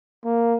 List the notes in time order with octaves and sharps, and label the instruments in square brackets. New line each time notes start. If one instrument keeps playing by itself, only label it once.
[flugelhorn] A#3